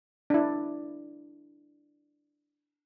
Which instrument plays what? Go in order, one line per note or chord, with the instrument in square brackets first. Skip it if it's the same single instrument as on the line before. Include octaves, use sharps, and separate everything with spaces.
[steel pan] D4 E4